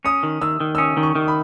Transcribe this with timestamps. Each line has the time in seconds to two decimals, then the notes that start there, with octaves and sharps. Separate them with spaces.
0.05 C#4 D#6
0.23 D#3
0.42 D#3 E6
0.60 D#3
0.75 E6
0.78 C#4 D#6
0.97 D#3
1.03 C#6
1.15 D#3
1.28 B5